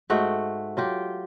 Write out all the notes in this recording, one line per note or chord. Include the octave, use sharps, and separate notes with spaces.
G#2 A3 F#4 G5
F#3 F4 G4